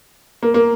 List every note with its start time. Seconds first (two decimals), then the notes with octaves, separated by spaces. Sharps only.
0.43 A#3
0.54 A#3